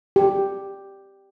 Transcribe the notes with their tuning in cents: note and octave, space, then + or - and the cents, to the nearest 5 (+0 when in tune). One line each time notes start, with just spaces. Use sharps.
G4 +0